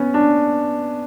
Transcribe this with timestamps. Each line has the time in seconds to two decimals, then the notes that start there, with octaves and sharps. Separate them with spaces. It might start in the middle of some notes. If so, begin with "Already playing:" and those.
Already playing: B3 C#4
0.14 D4